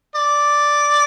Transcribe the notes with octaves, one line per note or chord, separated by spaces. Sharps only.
D5